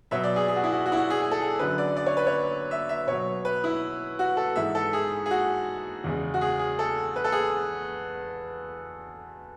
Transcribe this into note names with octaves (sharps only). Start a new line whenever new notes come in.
B2 F#3 E5
D5
G#4
G#4
F#4
E4
F#4
F#4
E4
F#4
G#4
G#4
A4
G#4
F#2 D3 F#3 B4
D5
D5
C#5
B4
C#5
E5
E5
B2 F#3 C#5
B4
E4
F#4
A4
G#2 E3 G#3 E5
A4
G#4
G#4
F#4
E2 C#3 G#3
F#4
G#4
G#4
A4
B4
A4
G#4